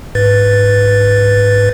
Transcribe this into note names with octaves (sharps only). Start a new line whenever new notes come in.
G#2 B4 A6